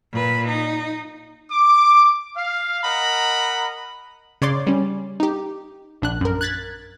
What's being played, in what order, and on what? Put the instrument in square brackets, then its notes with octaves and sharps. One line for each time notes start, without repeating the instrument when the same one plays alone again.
[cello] A#2 B4
D#4
[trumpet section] D6
F5
A#4 D#5 F#5 A#5 B5
[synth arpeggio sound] C#3 C#5 D5 C6 D6
G3 C#4
D#4 G4
A#1 D4 F#6
F#2 A#4
F#6 G#6 A6 B6